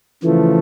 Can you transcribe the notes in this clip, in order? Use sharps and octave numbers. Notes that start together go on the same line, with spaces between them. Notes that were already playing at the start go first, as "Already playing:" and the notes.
C#3 E3 F3 A3